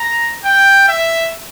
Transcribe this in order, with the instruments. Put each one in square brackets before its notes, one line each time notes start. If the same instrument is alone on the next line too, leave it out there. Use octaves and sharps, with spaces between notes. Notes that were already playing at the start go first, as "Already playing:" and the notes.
Already playing: [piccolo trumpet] A#5
G5
E5